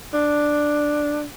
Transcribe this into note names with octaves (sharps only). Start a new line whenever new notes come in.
D4